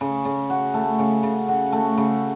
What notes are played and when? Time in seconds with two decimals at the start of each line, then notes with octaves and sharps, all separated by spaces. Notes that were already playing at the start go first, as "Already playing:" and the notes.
0.01 C#3
0.25 C#3
0.50 F#4
0.74 A3
0.99 C#3
1.23 C#3
1.49 F#4
1.72 A3
1.98 C#3